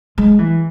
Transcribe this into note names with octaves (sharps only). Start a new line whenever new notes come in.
G#3
E3